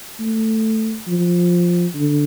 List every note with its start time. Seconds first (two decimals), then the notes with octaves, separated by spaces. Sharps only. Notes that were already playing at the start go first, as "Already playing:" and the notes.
0.20 A3
1.08 F3
1.95 D3